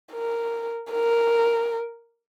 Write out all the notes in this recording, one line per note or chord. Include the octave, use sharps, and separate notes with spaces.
A#4
A#4